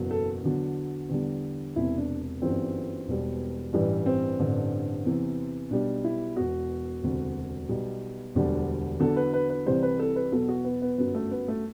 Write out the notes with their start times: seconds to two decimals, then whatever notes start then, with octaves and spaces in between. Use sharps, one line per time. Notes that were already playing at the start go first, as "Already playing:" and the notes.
Already playing: F#1 E2 B2 F#3
0.11 A4
0.43 E2 D3 F#3
1.09 E2 D3 G3
1.76 E1 E2 C3 E4
1.98 D4
2.42 G1 F#2 E3 G3 C4
3.08 E1 E2 B2 G3
3.73 A1 G2 E3 G3
4.06 C4
4.40 A1 G2 D3
5.05 E2 C3 E3
5.70 B1 B2 G3 D4
6.04 E4
6.36 E1 E2 B2 F#4
7.02 E1 D2 C3
7.69 B1 B2 G3
8.35 E1 D2 D3 G3
9.00 E2 D3 F#3 A4
9.16 B4
9.33 B4
9.50 B4
9.66 C2 C3 E3 G3 C5
9.83 B4
10.00 A4
10.16 B4
10.32 E2 B2 F#3 A4
10.48 F#4
10.65 B3
10.82 B3
10.98 G1 F#2 F#3 B3
11.15 A3
11.31 B3
11.48 A3